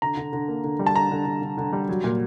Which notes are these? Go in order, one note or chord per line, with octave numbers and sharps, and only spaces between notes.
D3 A#5
D3
D3
A#3
D3
G3
A5
D3 A#5
D3
D3
D3
D3
G3
F#3
A#2